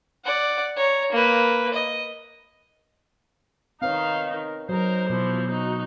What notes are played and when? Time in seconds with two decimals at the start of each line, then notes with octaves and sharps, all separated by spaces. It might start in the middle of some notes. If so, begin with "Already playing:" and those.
0.25 D5 F#5
0.77 C#5 A#5
1.12 A#3 B4
1.74 D#5
3.82 D#3 C4 D#4 B4 C#5 F5
4.33 A#4
4.69 F#3 D#4 A#4 C5
5.10 B2 E3 F3
5.51 D#4 F#4